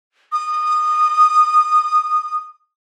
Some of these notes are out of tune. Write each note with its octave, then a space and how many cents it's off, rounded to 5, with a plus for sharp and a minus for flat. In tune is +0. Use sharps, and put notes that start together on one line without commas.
D#6 -20